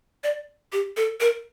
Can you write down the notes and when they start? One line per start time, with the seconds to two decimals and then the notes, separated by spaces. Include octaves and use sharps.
0.24 D5
0.73 G4
0.97 A4
1.21 A#4